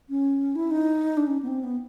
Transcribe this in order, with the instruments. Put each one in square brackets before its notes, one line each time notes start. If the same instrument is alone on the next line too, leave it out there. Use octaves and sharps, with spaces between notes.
[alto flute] C#4
E4
D#4
D4
C#4
B3
C4
B3